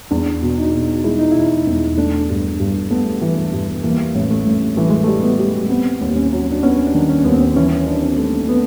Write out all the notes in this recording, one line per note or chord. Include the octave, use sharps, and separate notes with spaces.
E2 D4
B2
D#4
B2
G#3 E4
D#4
E1 E4
E2
A3 D4
G2
G2
A3 B3
E3
G2
E3 A#3
A1
A3
A1
E3 A3
G#3
A3
G3
B3
G3
B3 C4
D#2
C#4
F#3
D4
B3 C#4
D4
D#3
C#4
D#2 B3
C4
E3 C#4
D4
C4
A3
A3 B3